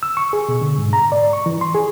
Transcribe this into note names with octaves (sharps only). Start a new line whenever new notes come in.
E6
C#6
G#4
B2
D3
G#2
A#5
D5
C#6
E3
C6
G#4